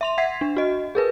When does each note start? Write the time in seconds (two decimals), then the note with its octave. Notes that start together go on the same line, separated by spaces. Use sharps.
0.01 E5 C6 F7
0.18 E5 F#5 G#6 B6 C7
0.41 D4
0.57 F#4 D#5
0.95 G#4 A#4 B4